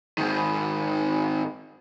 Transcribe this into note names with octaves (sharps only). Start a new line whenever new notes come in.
G#2 D#3